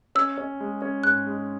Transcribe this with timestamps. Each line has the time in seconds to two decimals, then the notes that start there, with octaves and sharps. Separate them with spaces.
0.15 C#4 E6
0.38 C#4
0.60 G#3
0.82 C#4
1.04 G#2 F#6
1.26 G#3